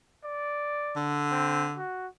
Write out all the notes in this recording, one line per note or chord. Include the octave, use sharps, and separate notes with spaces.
D5
D3
C4
F#4